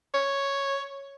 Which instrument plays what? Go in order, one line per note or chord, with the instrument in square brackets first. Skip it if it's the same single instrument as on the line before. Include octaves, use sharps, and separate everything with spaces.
[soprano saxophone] C#5